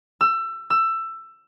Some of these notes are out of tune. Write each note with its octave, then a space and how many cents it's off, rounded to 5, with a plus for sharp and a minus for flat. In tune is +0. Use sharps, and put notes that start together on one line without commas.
E6 +25
E6 +15